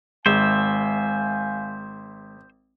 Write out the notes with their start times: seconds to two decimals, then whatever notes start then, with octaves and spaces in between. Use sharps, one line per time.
0.26 G#1 G#3 C5 E5 F5 G#5